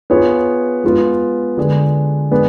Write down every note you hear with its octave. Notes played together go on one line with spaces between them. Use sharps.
B3 F4 G#4 C#5
G#3 B3 F4
D3 G#3 D4 G#4 B4
G#3 B3 D4 G#4